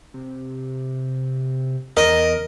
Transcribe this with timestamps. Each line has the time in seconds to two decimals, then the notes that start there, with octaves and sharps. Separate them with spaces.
0.14 C3
1.97 E2 A#4 D#5